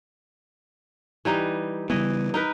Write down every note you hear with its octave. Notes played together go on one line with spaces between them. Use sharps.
E3 G3 D#4
C#3 E3 G3 B3 D#5
D#4 A#4 B4